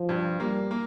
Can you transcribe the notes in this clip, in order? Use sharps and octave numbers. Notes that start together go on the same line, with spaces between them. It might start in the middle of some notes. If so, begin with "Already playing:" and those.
Already playing: F3
G2
G3 A#3
A#3